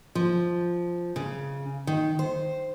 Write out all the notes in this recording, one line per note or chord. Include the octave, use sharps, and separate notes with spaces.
F3
C#3
D#3
C5